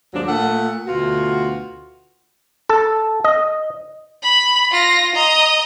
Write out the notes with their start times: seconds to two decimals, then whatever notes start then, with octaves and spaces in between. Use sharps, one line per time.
0.14 D#2 G#2 F3 F#3 D4
0.26 A#2 A3 A4 F#5
0.87 D2 B2 F4 F#4
2.69 A4
3.24 D#5
4.22 B5
4.71 F4 A#6
5.15 D#5 A#5